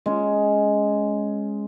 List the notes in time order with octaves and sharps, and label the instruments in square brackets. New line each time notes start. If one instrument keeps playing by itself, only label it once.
[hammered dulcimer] G#3 C#4